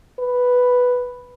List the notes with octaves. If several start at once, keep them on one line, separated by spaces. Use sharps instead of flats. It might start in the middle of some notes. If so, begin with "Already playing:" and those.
B4